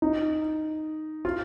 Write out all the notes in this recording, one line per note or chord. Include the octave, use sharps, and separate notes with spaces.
D#4
F4